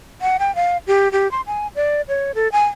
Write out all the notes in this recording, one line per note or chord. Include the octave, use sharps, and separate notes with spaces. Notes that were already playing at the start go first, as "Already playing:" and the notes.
F#5
G5
F5
G4
G4
C6
G#5
D5
C#5
A4
G#5